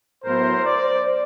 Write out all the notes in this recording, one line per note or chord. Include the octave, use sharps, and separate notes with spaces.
A2 F#3 B3 E4 A#4 C5
C5 D5